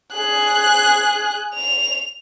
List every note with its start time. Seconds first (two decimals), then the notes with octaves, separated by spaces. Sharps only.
0.13 G#4 F#6
1.55 F7